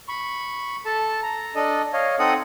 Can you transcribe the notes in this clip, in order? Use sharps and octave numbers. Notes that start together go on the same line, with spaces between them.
B5 C#6
A4 A5
A#5
D4 A4 D#5
C#5 D#5 F5
C4 D#4 A4 D#5 F#5 D#6